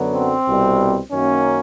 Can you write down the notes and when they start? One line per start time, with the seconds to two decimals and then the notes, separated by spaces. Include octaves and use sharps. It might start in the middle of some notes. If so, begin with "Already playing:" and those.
Already playing: F#2 D3 F#3 B3
0.16 C4
0.47 C2 B2 G3
1.12 F#2 D#3 F#3 A#3 C#4